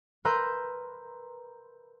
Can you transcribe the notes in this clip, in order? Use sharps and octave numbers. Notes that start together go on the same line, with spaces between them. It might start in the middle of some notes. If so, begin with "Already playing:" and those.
A#4 B4 A#5 C6 E6 G6